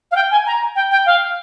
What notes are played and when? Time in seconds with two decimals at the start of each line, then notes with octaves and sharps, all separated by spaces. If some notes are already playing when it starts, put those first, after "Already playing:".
0.11 F5
0.16 G5
0.31 G#5
0.47 A#5
0.76 G5
0.91 G5
1.06 F5